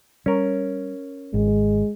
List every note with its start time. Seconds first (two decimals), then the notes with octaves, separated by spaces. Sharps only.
0.26 G3 C#4 A#4
1.34 G#1 G#3